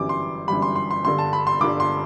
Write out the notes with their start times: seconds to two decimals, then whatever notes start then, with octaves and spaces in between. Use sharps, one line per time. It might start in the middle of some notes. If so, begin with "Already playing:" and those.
Already playing: G1 F#2 E3 G3 D6
0.09 C6
0.47 G1 F#2 E3 G3 B5
0.62 C6
0.76 C6
0.91 C6
1.04 G1 G2 D3 C6
1.18 A5
1.33 B5
1.47 C6
1.61 G1 G2 D3 D6
1.80 C6